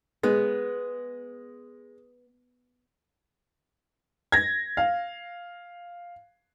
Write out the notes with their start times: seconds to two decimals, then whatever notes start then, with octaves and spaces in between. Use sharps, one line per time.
0.23 G#3 B3
4.32 G#6 A#6
4.77 F5